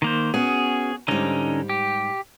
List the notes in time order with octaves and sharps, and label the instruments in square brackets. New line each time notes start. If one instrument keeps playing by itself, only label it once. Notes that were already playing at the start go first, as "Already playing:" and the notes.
[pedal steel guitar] D#3 A#3 C5
[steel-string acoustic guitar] B3 C#4 F#4 [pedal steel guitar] G#4
[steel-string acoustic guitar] G#2 G3 [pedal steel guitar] D3 C#4 D#4
[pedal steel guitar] G4